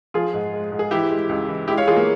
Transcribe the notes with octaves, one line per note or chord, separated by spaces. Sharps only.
F3 F4 G#4
G#2
G#3
G#2
G#4
E3 E4 G4
G#3
C#2
E3
G#3 E4 G4
C#5 F5
E3 F4 G#4
A#3